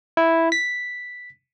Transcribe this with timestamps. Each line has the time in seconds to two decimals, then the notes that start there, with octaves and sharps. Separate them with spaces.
0.17 E4
0.52 B6